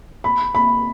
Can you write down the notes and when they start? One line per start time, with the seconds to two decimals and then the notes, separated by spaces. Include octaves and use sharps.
0.24 B5
0.55 B5